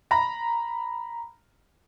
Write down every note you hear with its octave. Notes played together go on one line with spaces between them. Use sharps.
A#5 B5 A#6